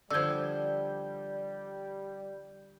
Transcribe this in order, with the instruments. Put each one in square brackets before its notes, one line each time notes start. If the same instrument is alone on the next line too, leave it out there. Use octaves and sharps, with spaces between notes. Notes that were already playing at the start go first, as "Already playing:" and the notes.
[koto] D3 F3 [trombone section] G3 [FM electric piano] D5 G6 [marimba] E6 G#6